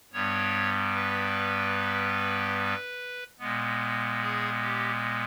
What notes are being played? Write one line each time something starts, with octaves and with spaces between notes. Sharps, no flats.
G2 G3 B3 C#5
B4
A#2 G#3 B3
G#4
G4